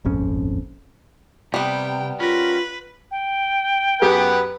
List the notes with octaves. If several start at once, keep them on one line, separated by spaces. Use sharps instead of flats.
D#1 G#1 F2 C#4
C3 G3 B3 G5
C#4 F4 A#4 B4
G5
F#2 G4 G#4 B4 F#5